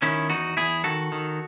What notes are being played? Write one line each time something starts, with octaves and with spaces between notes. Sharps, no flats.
D#3 C#4 E4
E2 D#4 F#4
E2 E4 G#4
D#3 F#4 A4
D#3